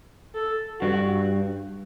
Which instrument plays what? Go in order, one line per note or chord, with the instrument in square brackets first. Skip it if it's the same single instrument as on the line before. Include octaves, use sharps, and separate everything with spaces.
[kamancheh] A4
[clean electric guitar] G2 [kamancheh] F#4